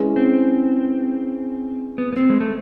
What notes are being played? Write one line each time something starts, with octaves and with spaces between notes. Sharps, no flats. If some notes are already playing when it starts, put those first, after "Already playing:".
Already playing: G#3 C#4 E4 G#4 B4
C4
B3
B3
C4
G#3
A3